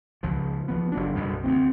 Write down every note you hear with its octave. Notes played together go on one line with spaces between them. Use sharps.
C#2 C#3 F3
F3 B3
F#1 F#3 D4
B1 F#2 B2 G3
D2 A#3 C4